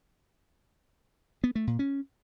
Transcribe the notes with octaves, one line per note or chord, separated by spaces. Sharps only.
B3
A3
A#2
C#4